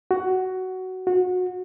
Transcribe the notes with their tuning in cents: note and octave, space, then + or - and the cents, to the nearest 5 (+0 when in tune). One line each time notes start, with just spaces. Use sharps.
F#4 +10
F#4 -25